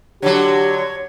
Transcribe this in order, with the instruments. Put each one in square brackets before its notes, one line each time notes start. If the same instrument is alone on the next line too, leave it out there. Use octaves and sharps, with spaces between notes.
[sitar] D3 F#3 [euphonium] G4 [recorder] C#5